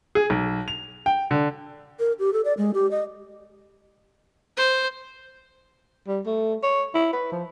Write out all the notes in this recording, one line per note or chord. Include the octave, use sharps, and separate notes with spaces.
G#4
B1
F7
G5
D3
A#4
G4
A4
D5
G#3
G4
D#5
C5
G3
A3
C#5
E4
B4
F3